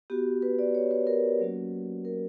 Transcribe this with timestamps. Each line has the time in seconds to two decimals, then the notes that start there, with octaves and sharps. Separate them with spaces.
0.10 B3 F#4 G4
0.42 B4
0.59 D5
0.75 C#5
0.91 B4
1.07 A#4
1.40 F#3 A#3 C#4 F#4
2.05 A#4